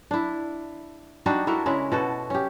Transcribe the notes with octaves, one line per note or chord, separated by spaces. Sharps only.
D4 E4
G3 D4 D#4 F#4
E4 F#4 A4 A#4
C#3 G#3 E4
B2 F#4 A4
C#4 G4